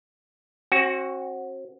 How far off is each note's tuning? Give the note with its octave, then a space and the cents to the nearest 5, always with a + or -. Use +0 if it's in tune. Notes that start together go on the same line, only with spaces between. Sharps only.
C4 +40 F#4 +0